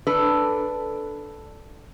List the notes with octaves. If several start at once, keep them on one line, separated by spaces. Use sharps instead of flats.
D4 A4 B4